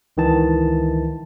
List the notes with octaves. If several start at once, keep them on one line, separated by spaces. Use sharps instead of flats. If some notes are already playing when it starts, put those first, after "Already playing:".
C#2 D#3 E3 A5